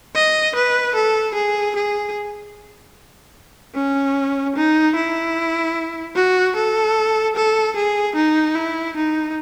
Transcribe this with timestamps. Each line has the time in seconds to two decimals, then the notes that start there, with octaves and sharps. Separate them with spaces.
0.15 D#5
0.55 B4
0.95 A4
1.35 G#4
1.76 G#4
3.75 C#4
4.56 D#4
4.96 E4
6.16 F#4
6.56 A4
7.36 A4
7.76 G#4
8.16 D#4
8.55 E4
8.96 D#4